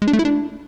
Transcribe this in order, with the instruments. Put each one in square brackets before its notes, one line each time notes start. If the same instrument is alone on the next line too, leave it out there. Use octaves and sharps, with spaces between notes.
[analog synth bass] G#3
D4
A3
E4
D4